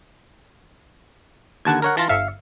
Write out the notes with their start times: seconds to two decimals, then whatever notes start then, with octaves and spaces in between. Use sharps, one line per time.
1.65 D#2 D3 F#5 A5 G#6
1.82 A#4 C#5 F#5
1.97 E3 F4 A5 A6 A#6
2.09 G1 E5 F5 C#7